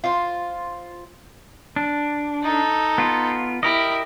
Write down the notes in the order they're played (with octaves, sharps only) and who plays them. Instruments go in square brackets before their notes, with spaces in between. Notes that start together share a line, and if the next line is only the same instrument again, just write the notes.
[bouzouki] F4 C5
[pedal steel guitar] D4
[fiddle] D#4 A4
[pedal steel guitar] B3 F4
[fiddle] E4 [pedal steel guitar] G4 A#4 D#5